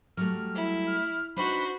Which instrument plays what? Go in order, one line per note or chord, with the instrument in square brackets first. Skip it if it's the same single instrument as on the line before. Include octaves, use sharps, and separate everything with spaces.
[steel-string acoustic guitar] F#3 G3 A3 [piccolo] F6
[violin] E4
[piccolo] F6
[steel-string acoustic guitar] D4 D#4 B4 [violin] F#4 C5 [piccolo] B5